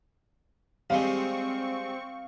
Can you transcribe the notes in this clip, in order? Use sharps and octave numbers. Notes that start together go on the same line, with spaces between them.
G3 G#3 C4 F5 C#6